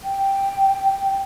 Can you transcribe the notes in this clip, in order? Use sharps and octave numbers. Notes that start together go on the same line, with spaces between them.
G5